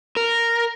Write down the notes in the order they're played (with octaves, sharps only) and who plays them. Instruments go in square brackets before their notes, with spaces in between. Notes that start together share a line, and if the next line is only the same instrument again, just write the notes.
[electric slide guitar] A#4